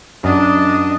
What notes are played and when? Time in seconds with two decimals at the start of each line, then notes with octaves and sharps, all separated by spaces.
0.24 F#2 D4 D#5